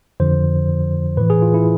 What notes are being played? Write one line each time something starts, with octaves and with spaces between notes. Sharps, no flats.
F2 D3 F3 C5
A2 E3 B4
G#4
F4
E4